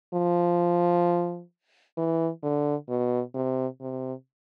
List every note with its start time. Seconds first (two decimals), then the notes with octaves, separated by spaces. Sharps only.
0.14 F3
1.97 E3
2.43 D3
2.89 B2
3.35 C3
3.81 C3